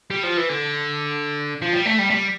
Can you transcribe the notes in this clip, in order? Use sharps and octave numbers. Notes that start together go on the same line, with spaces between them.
G3
F3
E3
D3
F3
G3
A3
G3
A3
G3